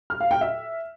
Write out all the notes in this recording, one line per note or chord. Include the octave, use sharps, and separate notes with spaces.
F6
F5
G5
E5